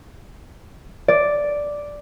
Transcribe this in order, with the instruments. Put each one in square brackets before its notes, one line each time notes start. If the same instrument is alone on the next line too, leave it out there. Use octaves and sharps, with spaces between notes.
[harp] D5